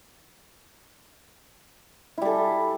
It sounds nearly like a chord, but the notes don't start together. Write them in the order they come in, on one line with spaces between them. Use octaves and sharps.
E4 G3 A4